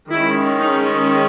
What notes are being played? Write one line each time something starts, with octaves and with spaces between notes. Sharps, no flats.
D#3 G#3 C#4 E4
D#4